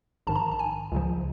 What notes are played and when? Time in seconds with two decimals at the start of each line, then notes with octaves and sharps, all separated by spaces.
0.27 A#1 G#2 D#3 A5
0.36 A#5
0.51 A5
0.59 G#5
0.91 C#2 C#3 F3